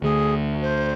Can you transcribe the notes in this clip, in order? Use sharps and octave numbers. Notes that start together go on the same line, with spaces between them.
D2 D3 A3 G#4
C5